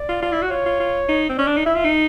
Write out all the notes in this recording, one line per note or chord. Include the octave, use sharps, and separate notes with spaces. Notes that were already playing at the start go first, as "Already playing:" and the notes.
Already playing: D5
F4
F4
E4
F#4
F4 C#5
F4
F4
D#4
C4
C#4 D5
D4
D#4
E4 E5
F4
D#4